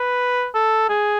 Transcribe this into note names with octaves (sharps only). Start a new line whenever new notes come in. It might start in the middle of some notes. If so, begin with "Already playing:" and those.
Already playing: B4
A4
G#4